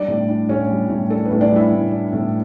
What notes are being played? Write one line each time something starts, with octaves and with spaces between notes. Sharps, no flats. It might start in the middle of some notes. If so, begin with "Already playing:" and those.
Already playing: G3 D4 D5
A2
D4
A2 C#4 C#5
G3
A2
D4 A4
B4
A2
D4 D5
G3 E4 E5
A2
D4
A2